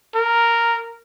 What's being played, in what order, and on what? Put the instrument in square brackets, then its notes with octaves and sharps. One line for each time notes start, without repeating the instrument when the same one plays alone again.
[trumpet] A#4